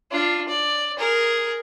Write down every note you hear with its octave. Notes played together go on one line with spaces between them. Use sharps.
D4 F4
D5
G#4 A#4